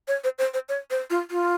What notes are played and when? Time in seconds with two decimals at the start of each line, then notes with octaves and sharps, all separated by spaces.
0.08 C#5
0.24 C5
0.38 C5
0.54 C5
0.69 C#5
0.90 C5
1.10 F4
1.31 F4